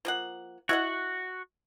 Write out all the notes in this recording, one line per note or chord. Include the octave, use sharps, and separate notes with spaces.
F3 A#3 F#5
E4 F#4 D#5 F#5